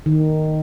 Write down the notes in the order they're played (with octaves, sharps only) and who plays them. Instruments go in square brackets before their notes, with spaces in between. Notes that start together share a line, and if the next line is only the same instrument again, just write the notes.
[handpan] D#3